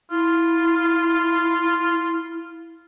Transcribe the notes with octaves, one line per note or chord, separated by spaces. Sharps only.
E4 F4